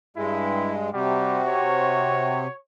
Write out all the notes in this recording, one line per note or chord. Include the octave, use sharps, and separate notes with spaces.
G2 G#3 E4
C3 G3 F#4
C#5